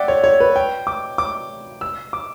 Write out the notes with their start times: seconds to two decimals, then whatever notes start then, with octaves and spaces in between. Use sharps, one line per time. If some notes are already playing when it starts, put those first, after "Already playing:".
Already playing: D5 E5 F#5 G5
0.08 C#5
0.24 C#5
0.40 B4
0.56 G5
0.87 D6
1.18 D6
1.81 E6
2.13 D6